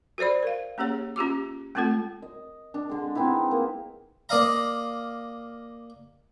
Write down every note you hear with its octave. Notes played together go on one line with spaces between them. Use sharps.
F#4 A4 C5 D5 B5
A#4 F5
A#3 C#4 G4 G#4 C#5
C#4 F4 G4 D6
G#3 A3 C4 F4 A4
D#5
D4
D3 G#3
B3 C4 D#4 E4
A#3
A#3 D5 D#5 F5 A#5